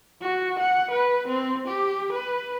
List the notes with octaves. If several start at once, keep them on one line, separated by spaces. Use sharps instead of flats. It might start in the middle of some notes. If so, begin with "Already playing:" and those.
F#4
F#5
B4
C4
G4
B4